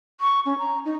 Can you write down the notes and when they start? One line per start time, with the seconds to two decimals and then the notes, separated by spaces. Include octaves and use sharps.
0.21 C#6
0.46 C#4
0.58 A#5
0.85 D#4